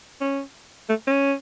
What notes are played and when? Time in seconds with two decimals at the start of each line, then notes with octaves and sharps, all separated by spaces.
0.21 C#4
0.89 A3
1.07 C#4